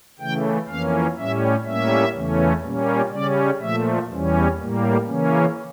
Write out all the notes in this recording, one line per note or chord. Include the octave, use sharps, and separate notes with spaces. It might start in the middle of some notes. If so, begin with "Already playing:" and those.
C#3 E3 A3 G5
F2 E3 A#3 C#4 F5
A2 G3 C#4 E5
A2 G3 A#3 C#4 E5
E2 C#3 E3 A3 C#4
A#2 G3 A#3 C#4
C#3 G3 C#4 D5
A#2 F3 A3 E5
E2 E3 G3 C#4
A2 G3 A#3
C#3 E3 A#3 C#4